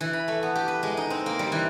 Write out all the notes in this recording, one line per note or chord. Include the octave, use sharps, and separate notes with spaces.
E3
B5
A3
B3
G4
B4
G#3
D#4
C4
A#3
G3
E3